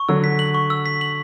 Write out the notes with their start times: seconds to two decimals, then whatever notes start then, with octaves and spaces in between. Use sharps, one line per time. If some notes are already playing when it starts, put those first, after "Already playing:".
Already playing: C#6
0.09 D3 F#3 E6
0.24 B6
0.39 F#7
0.54 C#6
0.70 E6
0.86 B6
1.01 F#7